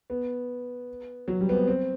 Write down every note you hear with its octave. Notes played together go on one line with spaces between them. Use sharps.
B3
F#3
G3
B3
C4
C4